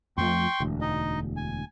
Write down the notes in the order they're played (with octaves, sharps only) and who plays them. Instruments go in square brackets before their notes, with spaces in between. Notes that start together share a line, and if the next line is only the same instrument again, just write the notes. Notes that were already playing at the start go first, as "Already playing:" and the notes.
[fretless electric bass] F2 F3 A3 [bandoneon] G5 C6 C#6
[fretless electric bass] E1 D2
[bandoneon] D#4 D#5
G#5